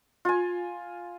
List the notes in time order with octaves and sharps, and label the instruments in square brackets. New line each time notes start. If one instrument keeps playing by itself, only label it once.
[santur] F4 G#5